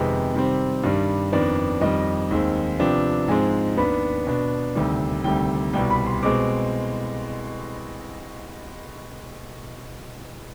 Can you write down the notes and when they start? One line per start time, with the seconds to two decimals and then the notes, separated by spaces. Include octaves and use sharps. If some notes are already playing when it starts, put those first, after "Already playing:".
Already playing: F2 C3 D#3 G#3 B3 G5
0.34 C3 D#3 G3 C4
0.83 G2 D#3 G3
1.32 F2 D#3 B3 D4 D5
1.81 F2 D#3 G3 D#5
2.31 D#2 D#3 G#3 C4
2.79 C3 F3 B3 D4 G5
3.28 G#2 F3 G#3 C4 G#5
3.77 D#2 D#3 B3 D4 B5
4.27 B2 B3 D4
4.75 D2 C3 D#3 G3
5.24 D2 C3 D#3 G3 G5
5.73 C2 B2 G3 G5
5.90 B5
6.06 C6
6.23 B2 G#3 C4 D6